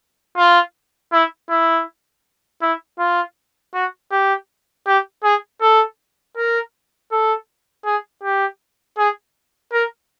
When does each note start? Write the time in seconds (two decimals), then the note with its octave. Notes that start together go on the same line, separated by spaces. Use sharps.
0.37 F4
1.13 E4
1.50 E4
2.62 E4
2.99 F4
3.74 F#4
4.11 G4
4.87 G4
5.24 G#4
5.61 A4
6.37 A#4
7.11 A4
7.85 G#4
8.23 G4
8.98 G#4
9.73 A#4